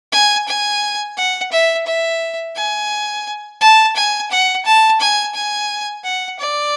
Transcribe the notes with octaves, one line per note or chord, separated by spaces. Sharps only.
G#5
G#5
F#5
E5
E5
G#5
A5
G#5
F#5
A5
G#5
G#5
F#5
D5